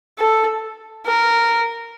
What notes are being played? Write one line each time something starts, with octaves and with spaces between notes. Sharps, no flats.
A4
A#4